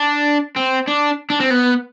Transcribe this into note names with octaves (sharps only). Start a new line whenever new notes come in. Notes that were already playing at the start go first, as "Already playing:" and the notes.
Already playing: D4
C4
D4
D4
C4
B3